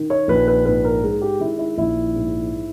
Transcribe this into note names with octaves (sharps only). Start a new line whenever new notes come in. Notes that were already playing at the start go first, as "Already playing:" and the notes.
Already playing: D#3
C#5
A#1 B4
B4
G#2 B4
A#4
G#3 G#4
G4
D#3 E4
E4
A#1 E4
G#2